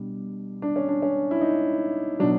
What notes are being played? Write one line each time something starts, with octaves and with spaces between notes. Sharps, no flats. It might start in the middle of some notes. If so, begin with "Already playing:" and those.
Already playing: B2 G3 D4
D4
C#4
D4
C#4
E4
D#4
B2 F#3 D4